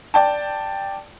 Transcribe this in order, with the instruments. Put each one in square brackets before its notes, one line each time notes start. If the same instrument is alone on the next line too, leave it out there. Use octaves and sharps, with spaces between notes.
[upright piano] D5 G5 A5